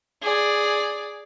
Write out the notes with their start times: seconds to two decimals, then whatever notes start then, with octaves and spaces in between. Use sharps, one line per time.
0.23 G#4 D5